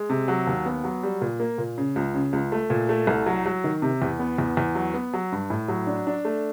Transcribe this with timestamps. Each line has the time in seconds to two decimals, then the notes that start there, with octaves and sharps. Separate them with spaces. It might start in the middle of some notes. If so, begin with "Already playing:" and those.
Already playing: G#3
0.10 C3
0.28 F#3
0.47 D#2
0.66 B3
0.84 F#3
1.03 G3
1.22 A#2
1.40 A#3
1.58 A#2
1.78 C#3
1.96 C#2
2.15 C#3
2.33 C#2
2.52 A3
2.70 A#2
2.89 A3
3.07 C2
3.26 F#3
3.46 F#3
3.64 D#3
3.82 C3
4.02 E2
4.19 B3
4.38 E2
4.57 E2
4.75 F#3
4.94 B3
5.13 F#3
5.32 G2
5.50 A2
5.68 F#3
5.87 D4
6.07 D4
6.25 A3